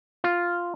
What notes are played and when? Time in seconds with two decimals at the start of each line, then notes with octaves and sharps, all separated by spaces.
0.24 F4